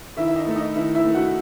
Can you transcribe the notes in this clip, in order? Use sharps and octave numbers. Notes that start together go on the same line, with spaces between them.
D#3 E4 E5
E5
D#4 D#5
A3
D#4 D#5
D#3 E4 E5
E4 E5
A3
F#4 F#5